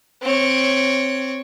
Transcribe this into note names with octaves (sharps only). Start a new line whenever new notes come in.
C4 C#5